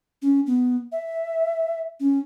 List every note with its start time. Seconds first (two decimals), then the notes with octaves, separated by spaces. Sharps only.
0.22 C#4
0.47 B3
0.92 E5
2.00 C#4